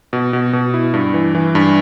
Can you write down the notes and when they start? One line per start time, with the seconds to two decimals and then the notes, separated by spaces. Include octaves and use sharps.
0.13 B2
0.33 B2
0.53 B2
0.74 E4
0.94 G2
1.14 E3
1.35 E3
1.55 G2